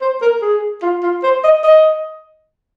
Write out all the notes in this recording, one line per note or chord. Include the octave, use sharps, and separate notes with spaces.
C5
A#4
G#4
F4
F4
C5
D#5
D#5